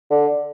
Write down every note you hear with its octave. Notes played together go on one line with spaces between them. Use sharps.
D3